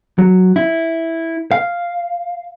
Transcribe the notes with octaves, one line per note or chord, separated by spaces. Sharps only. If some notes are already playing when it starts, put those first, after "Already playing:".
F#3
E4
F5